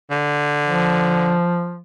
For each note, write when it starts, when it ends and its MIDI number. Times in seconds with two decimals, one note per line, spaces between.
0.11 1.36 50
0.66 1.83 53